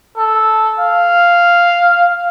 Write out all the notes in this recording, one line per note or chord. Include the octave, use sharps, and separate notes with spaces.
A4
F5